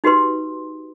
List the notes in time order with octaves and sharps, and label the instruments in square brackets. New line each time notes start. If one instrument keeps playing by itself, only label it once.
[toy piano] D#4 F#4 G4 B4 C6